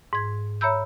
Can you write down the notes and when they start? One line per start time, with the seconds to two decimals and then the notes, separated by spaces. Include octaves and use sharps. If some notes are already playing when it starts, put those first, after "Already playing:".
0.13 G#2 G#6
0.61 C#5 E5 A#5 B5 E6 G6